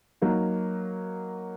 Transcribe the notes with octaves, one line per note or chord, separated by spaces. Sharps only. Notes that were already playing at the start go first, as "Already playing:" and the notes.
F#3 A#3 D#4